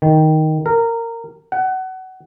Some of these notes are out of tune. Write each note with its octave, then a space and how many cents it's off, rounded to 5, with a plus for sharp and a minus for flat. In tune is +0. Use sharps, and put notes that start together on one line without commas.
D#3 +5
A#4 -15
F#5 +25